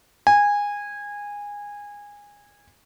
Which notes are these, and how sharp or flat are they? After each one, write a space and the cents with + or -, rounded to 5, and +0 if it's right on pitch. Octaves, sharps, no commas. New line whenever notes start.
G#5 -20